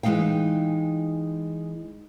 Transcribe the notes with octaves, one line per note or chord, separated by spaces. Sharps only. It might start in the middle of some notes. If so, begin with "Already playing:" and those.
E3 G#3 B3 D#4 F5 G5